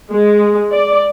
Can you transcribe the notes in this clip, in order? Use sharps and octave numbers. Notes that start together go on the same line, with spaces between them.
G#3
D5